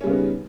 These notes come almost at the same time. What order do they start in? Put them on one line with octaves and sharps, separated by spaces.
C#4 G3 C#3 B3 D#4